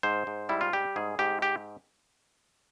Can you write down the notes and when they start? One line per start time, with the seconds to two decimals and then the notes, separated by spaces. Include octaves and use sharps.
0.03 G#2 C5
0.27 G#2
0.49 G3 E4
0.61 F4
0.73 G3 G4
0.96 G#2 G#4
1.19 G#2 G4
1.42 G4